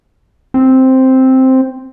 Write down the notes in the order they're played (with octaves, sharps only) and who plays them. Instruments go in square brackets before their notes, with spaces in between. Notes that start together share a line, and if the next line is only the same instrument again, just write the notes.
[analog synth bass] C4